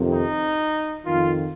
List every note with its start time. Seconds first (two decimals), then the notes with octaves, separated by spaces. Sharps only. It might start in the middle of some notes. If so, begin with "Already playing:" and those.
Already playing: F2 C3 D#3
0.13 D#4
1.05 F2 D#3 F4